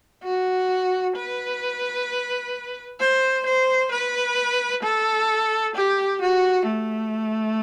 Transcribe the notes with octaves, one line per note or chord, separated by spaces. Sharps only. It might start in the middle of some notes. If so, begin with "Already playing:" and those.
F#4
B4
C5
C5
B4
A4
G4
F#4
A3